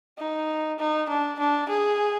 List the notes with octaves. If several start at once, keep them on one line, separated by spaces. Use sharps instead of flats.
D#4
D#4
D4
D4
G#4